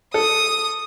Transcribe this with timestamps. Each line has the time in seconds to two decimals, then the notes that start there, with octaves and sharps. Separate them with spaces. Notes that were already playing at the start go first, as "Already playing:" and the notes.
0.14 A4 D#6